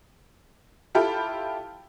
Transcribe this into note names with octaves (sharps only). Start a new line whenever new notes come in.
E4 F4 G4 A4 G5 B5